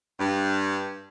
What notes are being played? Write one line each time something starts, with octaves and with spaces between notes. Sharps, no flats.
G2